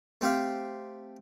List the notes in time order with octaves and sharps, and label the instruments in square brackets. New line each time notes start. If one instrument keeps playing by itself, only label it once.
[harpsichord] A3 C4 G4 F5